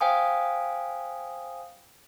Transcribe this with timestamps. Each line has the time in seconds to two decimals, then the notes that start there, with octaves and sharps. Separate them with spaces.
0.01 C5 F5 G5 G#5 D#6